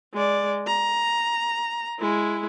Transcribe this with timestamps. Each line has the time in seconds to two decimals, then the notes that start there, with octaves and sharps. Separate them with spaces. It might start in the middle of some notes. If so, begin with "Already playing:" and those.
0.14 G#3 D5
0.67 A#5
1.99 G#3 E4